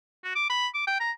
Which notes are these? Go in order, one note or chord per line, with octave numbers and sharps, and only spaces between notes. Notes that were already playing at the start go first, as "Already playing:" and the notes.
F#4
D6
B5
D6
G5
A#5